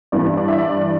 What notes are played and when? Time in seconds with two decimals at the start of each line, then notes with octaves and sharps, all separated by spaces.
0.12 G2 E3 B3 D5
0.37 D5
0.48 E5
0.58 D5